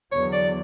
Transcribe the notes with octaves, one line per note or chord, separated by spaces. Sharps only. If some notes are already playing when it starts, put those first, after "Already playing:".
E2 D3 F#3 B3 C#5
D5